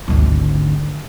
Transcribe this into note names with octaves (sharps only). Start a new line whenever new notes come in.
G#1 D2